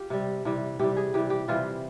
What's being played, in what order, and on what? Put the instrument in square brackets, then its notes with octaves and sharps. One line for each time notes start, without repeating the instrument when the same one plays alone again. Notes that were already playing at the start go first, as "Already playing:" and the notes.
Already playing: [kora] F4 G4
C3 G3
C3 E3 G3
C3 E3 G3 G4
G#4
C3 E3 G3 G4
G4
C3 E3 G3 F4